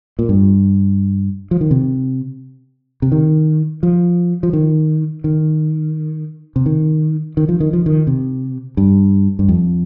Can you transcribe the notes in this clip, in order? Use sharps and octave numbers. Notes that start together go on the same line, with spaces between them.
A#2
G2
F3
D#3
C3
C3
D#3
F3
F3
D#3
D#3
C3
D#3
D#3
F3
D#3
F3
D#3
C3
G2
G2
F2